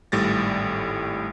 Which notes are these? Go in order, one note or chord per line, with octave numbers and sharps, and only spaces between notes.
G#1 A2 G3 A6 A#6